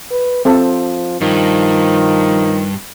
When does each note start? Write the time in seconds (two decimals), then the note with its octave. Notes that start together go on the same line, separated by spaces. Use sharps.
0.11 B4
0.45 F3 C4 A4
1.21 G2 D#3 F3